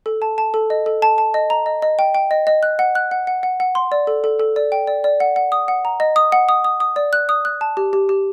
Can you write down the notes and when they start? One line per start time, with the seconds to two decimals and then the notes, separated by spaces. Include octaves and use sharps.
0.06 A4
0.22 A5
0.38 A5
0.54 A4
0.70 D#5
0.86 A4
1.02 A5
1.18 A5
1.34 D#5
1.50 A#5
1.66 D#5
1.82 D#5
1.99 G5
2.15 G5
2.31 D#5
2.47 D#5
2.63 F#6
2.79 F#5
2.95 F#6
3.11 F#5
3.27 F#5
3.43 F#5
3.60 F#5
3.75 C6
3.92 D5
4.07 A4
4.24 A4
4.40 A4
4.56 D5
4.72 G5
4.87 D5
5.04 D5
5.20 F#5
5.36 F#5
5.52 D#6
5.68 F#5
5.85 A#5
6.00 D#5
6.16 D#6
6.32 F#5
6.49 D#6
6.64 D#6
6.80 D#6
6.96 D5
7.13 F#6
7.29 D#6
7.45 F#6
7.61 A5
7.77 G4
7.93 G4
8.09 G4